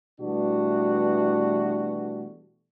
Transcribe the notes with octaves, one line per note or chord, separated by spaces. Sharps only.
B2 E3 G3 A3 D4 F#4